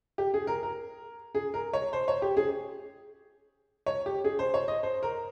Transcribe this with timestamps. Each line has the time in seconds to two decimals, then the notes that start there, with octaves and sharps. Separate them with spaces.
0.18 G4
0.34 G#4
0.47 A#4
0.63 A#4
1.35 G#4
1.54 A#4
1.73 C#5
1.93 C5
2.08 C#5
2.22 G4
2.37 G#4
3.86 C#5
4.06 G4
4.24 G#4
4.39 C5
4.54 C#5
4.68 D#5
4.83 C5
5.03 A#4